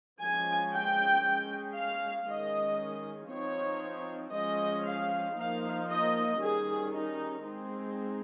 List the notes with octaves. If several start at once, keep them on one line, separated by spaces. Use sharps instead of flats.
F3 G#3 C#4 G#5
G5
G#3 C#4
F5
D#3 G#3 C#4 D#5
F3 C4 D#4 C#5
F3 G#3 C#4 D#5
F5
F3 A#3 D#4 F5
D#5
D#3 G3 C#4 G#4
D#4
G#3 C4 D#4